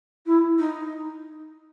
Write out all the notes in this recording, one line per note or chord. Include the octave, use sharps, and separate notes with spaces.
E4
D#4